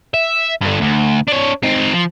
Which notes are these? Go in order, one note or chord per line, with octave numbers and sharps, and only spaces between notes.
E5
G2 D3
D2
D4 C#5
C4 D#4
F3